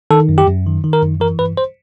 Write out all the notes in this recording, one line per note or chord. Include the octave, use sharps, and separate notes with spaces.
D#3 A4
F#2
G4
F#2
D#3
D#3
A#4
F#2
E3 A#4
G2 B4
C5